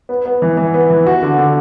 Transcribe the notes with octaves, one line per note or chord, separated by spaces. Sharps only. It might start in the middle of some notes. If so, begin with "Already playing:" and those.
B3
B3
E3
E3
B3
E3
F#4
D3
D3